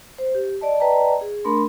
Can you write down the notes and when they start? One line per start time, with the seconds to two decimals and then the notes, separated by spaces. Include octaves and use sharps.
0.18 C5
0.35 G4
0.61 D5 D#5 A5
0.80 B4 D5 D#5 G5 A5 A#5
1.21 G#4
1.45 A3 D4 A#4 B5 C6